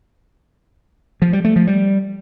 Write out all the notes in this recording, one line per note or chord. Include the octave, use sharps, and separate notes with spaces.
F3
G3
A3
F3
G3